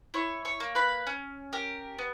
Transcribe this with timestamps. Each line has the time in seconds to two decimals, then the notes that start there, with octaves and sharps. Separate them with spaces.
0.14 E4 C#5 C#6
0.45 C#5 C#6
0.60 A#3
0.75 B4 B5
1.07 C#4
1.53 G4 A#4
1.99 B3